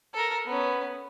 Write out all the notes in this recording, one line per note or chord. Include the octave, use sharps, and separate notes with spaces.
A4 A#4
B3 C#4